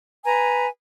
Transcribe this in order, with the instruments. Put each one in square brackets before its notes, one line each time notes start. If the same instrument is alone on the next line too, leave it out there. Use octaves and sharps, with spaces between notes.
[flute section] B4 G#5 A#5